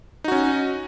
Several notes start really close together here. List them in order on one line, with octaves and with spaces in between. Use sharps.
D#4 F#4 C#4